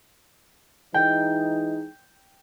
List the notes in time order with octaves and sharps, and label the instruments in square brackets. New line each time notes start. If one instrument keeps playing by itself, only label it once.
[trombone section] E3 G#3 D#4 [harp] G5